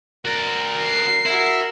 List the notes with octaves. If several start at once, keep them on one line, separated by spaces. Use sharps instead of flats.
F#4 A#4 D5
C7
E4 F#4 A#4